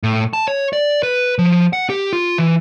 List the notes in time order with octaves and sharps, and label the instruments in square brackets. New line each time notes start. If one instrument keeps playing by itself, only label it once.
[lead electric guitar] A2
A5
C#5
D5
B4
F3
F#5
G4
F4
E3